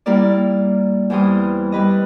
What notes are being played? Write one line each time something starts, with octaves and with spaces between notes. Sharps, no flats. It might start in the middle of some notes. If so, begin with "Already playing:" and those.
G3 A#3 E4 A#4 D5
E2 E3 G3 C5 D#6
G3 B4 D#5